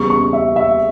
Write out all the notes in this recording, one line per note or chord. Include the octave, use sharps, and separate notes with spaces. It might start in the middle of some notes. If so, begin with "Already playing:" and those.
Already playing: E2 C#3 G3 B3 C#6
C#6
E5
E5